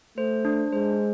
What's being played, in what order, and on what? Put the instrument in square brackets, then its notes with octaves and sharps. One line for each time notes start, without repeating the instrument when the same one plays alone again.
[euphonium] A3 [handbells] C5
[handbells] D4
[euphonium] G#3 [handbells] C5